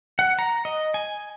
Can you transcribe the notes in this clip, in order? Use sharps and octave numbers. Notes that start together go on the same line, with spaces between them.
F#5
A#5
D#5
G#5